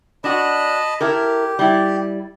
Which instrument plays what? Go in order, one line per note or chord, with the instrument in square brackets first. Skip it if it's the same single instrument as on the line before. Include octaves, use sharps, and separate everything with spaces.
[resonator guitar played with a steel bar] D4 F#4 [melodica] D#5 A5 B5
[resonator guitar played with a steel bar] E4 A4 A#4 [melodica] G4
[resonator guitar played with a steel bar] G3 E4